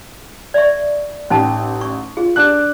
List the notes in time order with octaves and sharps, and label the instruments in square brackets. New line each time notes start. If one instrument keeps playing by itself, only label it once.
[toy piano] D5 E5 C#6
[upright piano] A1 [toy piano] C#4 D#4 A5
[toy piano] C#6
[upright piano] F4 [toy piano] G#4
[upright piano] D4 F#6